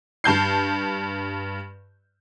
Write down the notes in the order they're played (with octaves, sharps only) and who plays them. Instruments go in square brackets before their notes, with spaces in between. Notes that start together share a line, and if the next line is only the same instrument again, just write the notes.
[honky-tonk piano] G2 A5 G6 C7